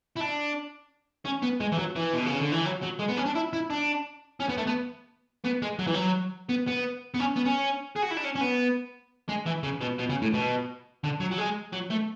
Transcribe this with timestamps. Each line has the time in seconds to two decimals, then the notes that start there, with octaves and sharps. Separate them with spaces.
0.17 E4
0.21 D4
1.25 C#4
1.43 B3
1.61 G#3
1.72 E3
1.78 F#3
1.96 E3
2.13 B2
2.26 C#3
2.40 D3
2.52 E3
2.66 F#3
2.83 F#3
3.00 G#3
3.09 B3
3.17 C#4
3.26 D4
3.35 E4
3.53 E4
3.70 D4
4.40 C#4
4.49 B3
4.57 A3
4.67 B3
5.45 B3
5.62 G#3
5.79 F#3
5.87 E3
5.94 F#3
6.49 B3
6.67 B3
7.14 B3
7.20 C#4
7.36 B3
7.46 C#4
7.96 G#4
8.02 F#4
8.11 E4
8.17 D4
8.24 C#4
8.35 C#4
8.41 B3
9.29 G#3
9.46 E3
9.63 C#3
9.81 B2
9.99 B2
10.10 C#3
10.22 A2
10.34 B2
11.04 D3
11.20 F#3
11.32 F#3
11.38 G#3
11.73 F#3
11.91 A3